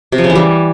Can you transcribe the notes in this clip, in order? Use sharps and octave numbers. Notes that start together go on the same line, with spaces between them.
C3
F3
C#3
E3
G3